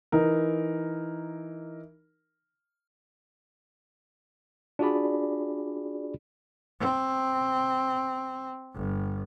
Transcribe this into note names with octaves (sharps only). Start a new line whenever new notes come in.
E3 D#4 A#4
D4 F4 F#4 G#4 D5 B5
C4
G1